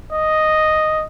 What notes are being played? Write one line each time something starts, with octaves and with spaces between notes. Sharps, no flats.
D#5